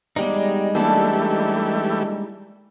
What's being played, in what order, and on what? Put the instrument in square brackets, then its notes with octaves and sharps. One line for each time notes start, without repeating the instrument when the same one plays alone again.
[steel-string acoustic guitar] E2 G4 D5 [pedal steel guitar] G3 G#3 D#4
[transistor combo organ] E3 A3 G4 [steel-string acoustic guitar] A#3 D4 A4